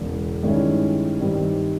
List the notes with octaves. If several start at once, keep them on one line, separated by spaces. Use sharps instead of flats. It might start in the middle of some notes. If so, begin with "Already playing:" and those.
Already playing: E1 E2 C#3
G2 D#3 G#3 C#4 E4
G2 D#3 G3 C4